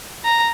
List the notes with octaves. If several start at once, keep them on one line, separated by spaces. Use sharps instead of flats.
A#5